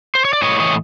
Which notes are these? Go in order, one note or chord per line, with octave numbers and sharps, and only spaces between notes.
C5
C#5
D5
A2 C#5 D#5
E3 C#5 D#5